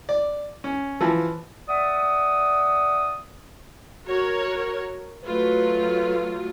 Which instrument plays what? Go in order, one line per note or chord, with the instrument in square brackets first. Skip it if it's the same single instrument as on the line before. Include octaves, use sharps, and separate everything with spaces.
[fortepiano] D5
C#4
E3 F3
[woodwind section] D5 E5 F#5 D#6
[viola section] F#4 A#4 C#5
[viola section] F#3 A3 F4 [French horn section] B4